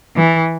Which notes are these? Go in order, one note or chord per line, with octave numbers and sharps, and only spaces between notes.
E3